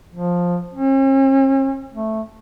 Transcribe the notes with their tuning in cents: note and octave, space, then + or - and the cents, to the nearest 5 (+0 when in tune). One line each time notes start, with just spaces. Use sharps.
F3 +10
C#4 -45
A3 -5